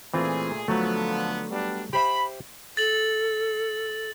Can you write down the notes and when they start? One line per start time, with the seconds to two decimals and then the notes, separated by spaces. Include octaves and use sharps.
0.14 A#2 E3 A3 C4 F4 G#4
0.68 D3 F3 F#3 A3 B3
1.51 G3 B3 D4
1.93 G4 C5 E5 B5
2.77 A4 A6 F#7